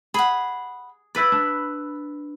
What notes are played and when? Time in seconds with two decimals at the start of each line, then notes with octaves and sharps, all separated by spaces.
0.14 G#4 F#5 B5
1.15 E4 B4 D5 B5
1.32 D4